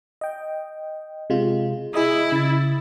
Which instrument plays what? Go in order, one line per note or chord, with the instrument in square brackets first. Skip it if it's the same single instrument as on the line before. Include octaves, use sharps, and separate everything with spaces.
[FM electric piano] D#5 G5
C3 G#3 F4
[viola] E4 [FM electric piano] G#4 D#5 D#6
[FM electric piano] C#3 A6